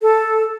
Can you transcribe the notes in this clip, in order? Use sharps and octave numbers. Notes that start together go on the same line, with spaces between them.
A4